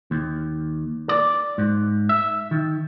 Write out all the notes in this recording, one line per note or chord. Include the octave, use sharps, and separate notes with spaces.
D#2
D5
G#2
E5
D#3